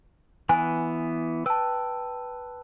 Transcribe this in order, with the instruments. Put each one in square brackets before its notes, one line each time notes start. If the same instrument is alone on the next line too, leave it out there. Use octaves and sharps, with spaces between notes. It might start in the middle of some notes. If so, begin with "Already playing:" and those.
[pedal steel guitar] E3 B3 F#6 [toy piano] G#5
[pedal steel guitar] B4 G5 [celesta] A5 E6